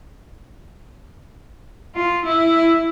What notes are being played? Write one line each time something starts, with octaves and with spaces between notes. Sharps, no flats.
F4
E4